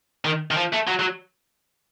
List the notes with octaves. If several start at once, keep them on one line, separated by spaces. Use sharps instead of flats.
D#3
D#3
F3
A3
F#3
F#3